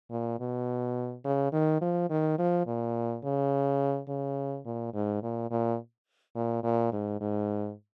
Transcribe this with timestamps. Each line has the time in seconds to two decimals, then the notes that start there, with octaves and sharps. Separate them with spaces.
0.11 A#2
0.40 B2
1.25 C#3
1.53 D#3
1.81 F3
2.10 D#3
2.39 F3
2.67 A#2
3.24 C#3
4.08 C#3
4.65 A#2
4.94 G#2
5.23 A#2
5.51 A#2
6.35 A#2
6.63 A#2
6.92 G#2
7.21 G#2